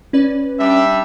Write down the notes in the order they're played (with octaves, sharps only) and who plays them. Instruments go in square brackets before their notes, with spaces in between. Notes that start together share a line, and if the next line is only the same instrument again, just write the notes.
[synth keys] C#4 B4 D5
[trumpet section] G3 D4 E5